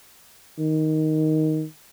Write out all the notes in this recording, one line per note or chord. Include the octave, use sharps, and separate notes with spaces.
D#3